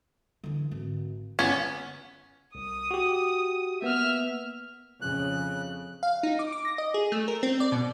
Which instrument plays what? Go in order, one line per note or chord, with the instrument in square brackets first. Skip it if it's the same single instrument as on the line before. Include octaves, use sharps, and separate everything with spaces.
[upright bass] D3 E3
G#1
[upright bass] F#1 [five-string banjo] B3 C#4
[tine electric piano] C2 [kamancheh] D#6
[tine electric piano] F#4 G4
[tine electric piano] A#3 B3 [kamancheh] E5 F6
[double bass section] F2 C#3 [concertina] F#6
[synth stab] F5
D#4
D6
D6
A#6
D#5
G#4
A3
A#4
C4
D5
B2